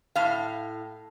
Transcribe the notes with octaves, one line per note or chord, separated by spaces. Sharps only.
A2 F5